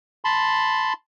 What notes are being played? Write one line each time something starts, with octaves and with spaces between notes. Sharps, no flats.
A5 B5 C6